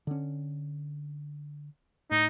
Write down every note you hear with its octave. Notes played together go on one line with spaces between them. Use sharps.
D3 C#4
A2 D#4